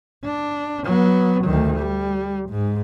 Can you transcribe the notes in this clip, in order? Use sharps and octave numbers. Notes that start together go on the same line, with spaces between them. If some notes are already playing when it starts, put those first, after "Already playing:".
D4
F#3 B3
D2 D#3
G3
G#2